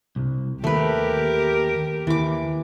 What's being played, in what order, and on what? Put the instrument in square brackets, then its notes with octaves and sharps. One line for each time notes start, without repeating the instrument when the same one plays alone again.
[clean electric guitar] C2
[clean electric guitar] D#2 [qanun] A3 B4 [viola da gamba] G4 A#4
[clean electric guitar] D#2 [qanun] E3 D6